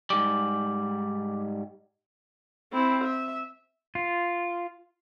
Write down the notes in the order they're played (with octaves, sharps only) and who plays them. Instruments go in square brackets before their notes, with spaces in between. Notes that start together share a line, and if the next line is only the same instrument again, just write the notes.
[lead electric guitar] G#2 G3 [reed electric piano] D6
[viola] C4 E4
E5
[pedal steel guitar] F4